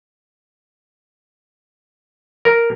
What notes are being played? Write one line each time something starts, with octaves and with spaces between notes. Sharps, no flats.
A#4